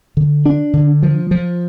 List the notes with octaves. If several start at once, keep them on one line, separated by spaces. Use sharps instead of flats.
D3
D4
D3
F3
F3